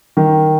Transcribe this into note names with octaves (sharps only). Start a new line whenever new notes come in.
D#3